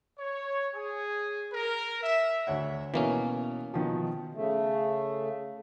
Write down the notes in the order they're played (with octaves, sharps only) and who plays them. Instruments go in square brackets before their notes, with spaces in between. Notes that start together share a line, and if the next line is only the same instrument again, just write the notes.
[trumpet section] C#5
G#4
A#4
E5
[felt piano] D2 C#5 F#5
[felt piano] B2 [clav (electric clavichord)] E3 A#3 C#4
[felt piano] B2 D#3 F3
[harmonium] C#3 A3